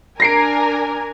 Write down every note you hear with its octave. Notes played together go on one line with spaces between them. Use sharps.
D4 A#4 G#5 A#6 C7 D7